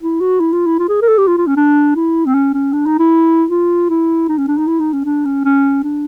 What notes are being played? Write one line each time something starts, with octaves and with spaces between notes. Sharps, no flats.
E4
F#4
E4
F4
E4
F4
G#4
A#4
A4
G4
F4
F4
C#4
D4
E4
C4
C#4
C#4
D4
D#4
E4
F4
E4
D#4
C#4
D4
D#4
E4
D#4
C#4
D4
C#4
C#4
D4